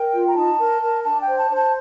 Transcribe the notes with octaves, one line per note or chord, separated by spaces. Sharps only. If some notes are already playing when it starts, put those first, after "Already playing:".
Already playing: A#4 G5
F4
A#5
D#4 A5
A#4
A#4
D4 A5
G5
C5
A5
C5
A5